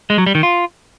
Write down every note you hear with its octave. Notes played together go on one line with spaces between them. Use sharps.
G#3
F#3
G3
D#3
F4